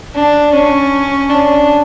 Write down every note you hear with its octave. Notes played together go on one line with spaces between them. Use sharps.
D4
C#4
D4